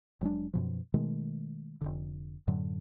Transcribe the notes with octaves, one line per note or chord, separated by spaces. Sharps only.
F1 F#3 G#3 D4
F#2 B2 F3
B2 D#3 G#3 A3
F1 A#1 D3
F#2 A2 D3 F#3